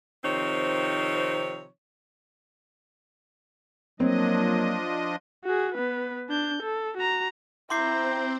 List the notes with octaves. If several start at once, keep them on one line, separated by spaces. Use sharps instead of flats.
C3 D#3 F3 C4 D#4 C#5
F3 F#3 A#3 C4 D4 D#5
F#4 G#4
B3 B4
D4 G6
A4
F#4 A#5
C4 E4 C5 A#5 C6 D6 G6 C7